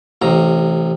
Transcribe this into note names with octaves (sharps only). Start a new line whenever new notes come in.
A1 C3 A#5